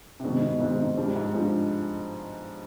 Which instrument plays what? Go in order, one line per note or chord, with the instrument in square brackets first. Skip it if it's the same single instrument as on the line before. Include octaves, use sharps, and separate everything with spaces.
[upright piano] C3
[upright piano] G2 B2 [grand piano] D#3 G#3 C4 D#4
[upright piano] G2 B2
[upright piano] G#2 [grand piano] D#3 G#3 C4 D#4
[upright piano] G#2
[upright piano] G2 [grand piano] F3 G#3 D4 G4 C5
[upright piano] G#2
[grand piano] F3 G#3 D4 G4 C5